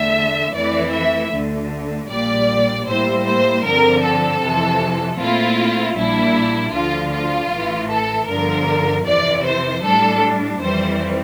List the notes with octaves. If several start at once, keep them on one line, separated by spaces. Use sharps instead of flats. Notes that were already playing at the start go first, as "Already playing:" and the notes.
Already playing: E2 D3 A3 E5
F2 E3 A3 E4 D5
E5
D2 D3 A3
A#1 A#2 G3 D5
A2 G3 A#3 E4 C5
C5
G2 D3 F3 C4 A#4
A4
F2 C3 E3
A#2 A3 C4 E4 F4
A#1 A#2 G3 D4 E4
D2 D3 F3 F4
F4
A1 A2 E3
A4
G1 G2 D3 F3 A#4
F2 C3 E3 D5
C5
A2 G3 D4 A4
F2 E3 G3 C4 C5